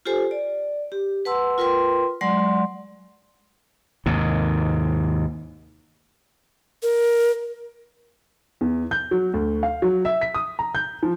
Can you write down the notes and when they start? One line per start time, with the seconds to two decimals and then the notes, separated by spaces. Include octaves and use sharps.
0.05 F4 G4 A4 C5 G#5
0.31 D5
0.92 G4
1.25 B4 F#5 A5 C6 E6
1.58 F4 A#4 B4 G5 C6
2.21 F#3 G#3 D5 F#5 C6
4.06 D#2 G#2 C3
6.83 A#4
8.61 E2
8.91 G6
9.11 F#3
9.34 D2
9.63 F5
9.82 F#3
10.05 E5
10.21 B6
10.34 D#6
10.59 A#5
10.75 G6
11.03 F3